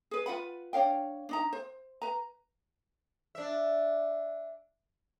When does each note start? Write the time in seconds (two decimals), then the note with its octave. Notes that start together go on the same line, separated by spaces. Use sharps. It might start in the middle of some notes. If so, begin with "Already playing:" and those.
0.11 G#4 B4
0.26 F4 B4 F#5 B5
0.73 D4 C#5 F5 G5
1.29 D4 D#4 A#5
1.53 C5
2.02 B4 A#5
3.35 D4 E5